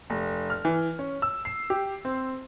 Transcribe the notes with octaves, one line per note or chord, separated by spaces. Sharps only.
F1
F6
E3
C#4
E6
C7
G4
C4